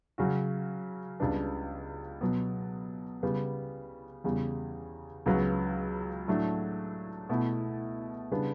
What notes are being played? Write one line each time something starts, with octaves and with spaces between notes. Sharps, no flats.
C#3 F#3 C#4 F#4
C#2 C#3 G3 B3 D4
B2 F#3 B3
C#3 G3 B3
E2 C#3 G3
C#2 C#3 F#3 B3 F#4
A2 F#3 A3 D4
B2 A3 E4
C#3 G3 B3 D4